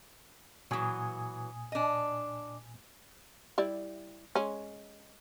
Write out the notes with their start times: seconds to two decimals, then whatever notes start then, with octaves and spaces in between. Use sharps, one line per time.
0.71 A#2 E3 F#3 G#5 D#6
1.72 D4 D#5
3.58 G3 E4 D5
4.35 G#3 C#4